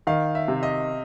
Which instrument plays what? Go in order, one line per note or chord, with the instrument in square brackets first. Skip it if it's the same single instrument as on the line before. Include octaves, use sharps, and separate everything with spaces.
[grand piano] D#3 [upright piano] F5
[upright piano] E5
[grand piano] C3
[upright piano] D#5